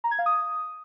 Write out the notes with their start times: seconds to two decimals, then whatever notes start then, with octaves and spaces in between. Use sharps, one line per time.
0.04 A#5
0.11 G#6
0.19 F5
0.26 D#6